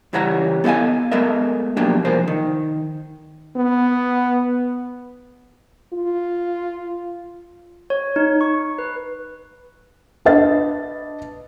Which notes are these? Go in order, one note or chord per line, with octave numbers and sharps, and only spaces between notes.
C#2 E3 G3 C#5 F#5 A#5
B3 A4 D#5 F5 G#5
G#3 A3 B3 A#4 D#5 E5
F3 F#3 A#3 D4 G4
C2 F3 A#4 C5
D#3
B3
F4
C#5
D#4
C#6
B4
D4 B4 D#5 A6